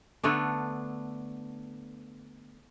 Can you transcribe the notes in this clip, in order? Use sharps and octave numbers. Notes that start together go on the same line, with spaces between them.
D3 A3 B3 D4